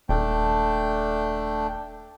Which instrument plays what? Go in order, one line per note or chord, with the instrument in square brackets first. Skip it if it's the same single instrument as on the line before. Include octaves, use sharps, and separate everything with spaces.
[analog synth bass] D#1 [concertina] A3 D4 G5